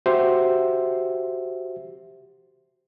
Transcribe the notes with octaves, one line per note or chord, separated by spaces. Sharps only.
F#4 G4 C5 E5